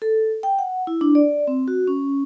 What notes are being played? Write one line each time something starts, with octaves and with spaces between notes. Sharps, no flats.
A4
G5
F#5
E4
D4
D5
C4
F#4
C#4